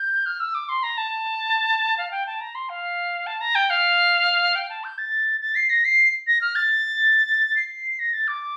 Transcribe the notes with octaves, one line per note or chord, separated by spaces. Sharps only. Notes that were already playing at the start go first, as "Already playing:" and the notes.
Already playing: G6
F6
E6
D6
C6
A#5
A5
F5
G5
A5
A#5
C6
F5
A5
A#5
G5
F5
G5
A5
G6
A6
A6
C7
A#6
C7
A#6
F6
A6
C7
A#6
A6
D6